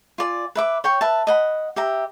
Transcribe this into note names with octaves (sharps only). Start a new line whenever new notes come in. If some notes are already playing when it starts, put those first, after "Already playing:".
F4 D5 G#5
B4 E5 D6
C#5 G5 C#6
B4 E5 A5
D#5 F#5 B5
G4 E5 A#5